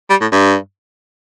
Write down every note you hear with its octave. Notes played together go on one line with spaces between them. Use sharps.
G3
A2
G2